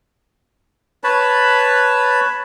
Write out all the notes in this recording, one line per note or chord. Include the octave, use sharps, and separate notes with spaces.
B4 C#5 A5 B5